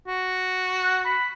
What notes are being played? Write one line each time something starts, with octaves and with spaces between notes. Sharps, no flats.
F#4
F#5
B5